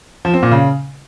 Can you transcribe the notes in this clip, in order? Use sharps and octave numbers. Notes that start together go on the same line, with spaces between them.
F3
C4
A#2
C#3